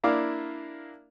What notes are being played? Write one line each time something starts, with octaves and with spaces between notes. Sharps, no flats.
A#3 D4 E4 F5 D6